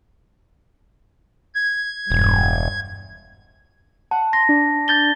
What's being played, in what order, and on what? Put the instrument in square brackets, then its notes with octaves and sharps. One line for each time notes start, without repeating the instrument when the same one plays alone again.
[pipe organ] G#6
[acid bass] E1 [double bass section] G2
[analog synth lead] F#5 [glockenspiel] A5
[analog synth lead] C6 [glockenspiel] A#6
[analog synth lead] D4
[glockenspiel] G6 A6 G7